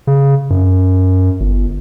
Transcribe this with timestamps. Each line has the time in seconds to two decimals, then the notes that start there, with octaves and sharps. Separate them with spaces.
0.07 C#3
0.50 F#2
1.40 G1